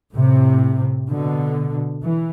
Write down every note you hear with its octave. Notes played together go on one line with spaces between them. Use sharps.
A2 C3
B2 D3
E3